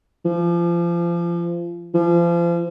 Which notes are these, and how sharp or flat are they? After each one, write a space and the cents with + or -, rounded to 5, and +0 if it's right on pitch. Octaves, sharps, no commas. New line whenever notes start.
F3 -30
F3 -35